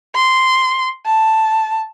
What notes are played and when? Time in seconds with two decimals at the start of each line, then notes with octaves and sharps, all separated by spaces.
0.15 C6
1.06 A5